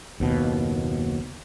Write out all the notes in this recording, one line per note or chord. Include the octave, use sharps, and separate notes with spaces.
F#1 D#2 B2